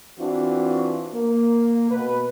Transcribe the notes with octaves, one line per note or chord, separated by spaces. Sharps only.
E3 C4 D4 F4 F#4
A#3
B2 B4